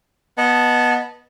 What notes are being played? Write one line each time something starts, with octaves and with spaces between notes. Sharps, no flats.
B3 D#5 A5